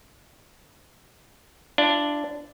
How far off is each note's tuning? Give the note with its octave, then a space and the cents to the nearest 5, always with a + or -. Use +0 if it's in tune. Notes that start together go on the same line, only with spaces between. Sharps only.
D4 +0 F4 -45